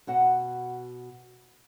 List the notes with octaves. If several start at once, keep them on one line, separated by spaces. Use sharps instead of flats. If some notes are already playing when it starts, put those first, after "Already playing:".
B2 F#4 F#5